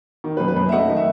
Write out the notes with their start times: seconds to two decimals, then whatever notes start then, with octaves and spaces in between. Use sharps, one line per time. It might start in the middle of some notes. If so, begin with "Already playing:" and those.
0.24 D#3
0.37 B4
0.40 F#2
0.48 B4
0.56 F#2
0.69 E5
0.72 A3 D#5 F#5
0.89 D#3
0.97 E5